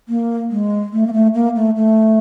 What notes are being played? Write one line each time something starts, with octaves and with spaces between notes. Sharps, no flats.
A#3
G#3
A3
A#3
A3
A#3
A3
A3